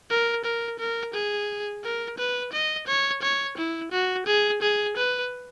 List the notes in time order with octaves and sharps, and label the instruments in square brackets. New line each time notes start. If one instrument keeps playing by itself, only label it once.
[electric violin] A#4
A#4
A#4
G#4
A#4
B4
D#5
C#5
C#5
E4
F#4
G#4
G#4
B4